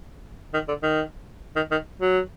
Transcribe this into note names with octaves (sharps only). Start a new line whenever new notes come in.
D#3
D3
D#3
D#3
D#3
F#3